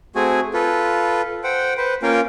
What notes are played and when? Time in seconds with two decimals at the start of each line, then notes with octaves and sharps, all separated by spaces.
0.15 A3 C4 F#4 G#4 G#5
0.54 F4 A4 B4
1.44 C5 F#5 G5
1.78 B4 C5
2.03 A#3 C#4 F4 A#4 F5 G5